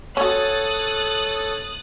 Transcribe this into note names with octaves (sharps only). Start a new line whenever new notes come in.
C#4 F#4 A4 C#5 D#6 F#6 A6